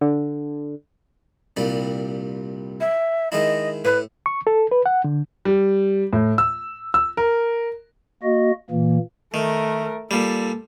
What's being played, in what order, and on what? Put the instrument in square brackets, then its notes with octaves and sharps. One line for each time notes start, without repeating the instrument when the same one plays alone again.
[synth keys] D3
[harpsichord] C2 A#2 G3
[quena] E5
[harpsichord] D#3 G#3 E4 [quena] D#5
[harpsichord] A2 [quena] B4
[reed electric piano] C#6
A4
B4
F#5
D3
[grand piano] G3
A2
E6
E6
A#4
[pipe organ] A#3 F#4 D#5
A#2 E3 A#3
[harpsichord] D#3 [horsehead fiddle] A3 A#4
[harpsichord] A#2 G3 [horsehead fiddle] A4